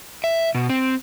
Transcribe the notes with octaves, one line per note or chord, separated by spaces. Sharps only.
E5
B2
C4